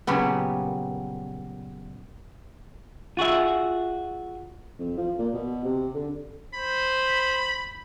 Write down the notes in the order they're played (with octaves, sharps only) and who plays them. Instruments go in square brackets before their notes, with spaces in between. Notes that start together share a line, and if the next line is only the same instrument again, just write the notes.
[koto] A#2 C#3 F#3 G3 B3
[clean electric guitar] F4 F#4 G#4 E5
[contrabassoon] F2
F3
A#2
B2
C3
D3
[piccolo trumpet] C5 [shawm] B5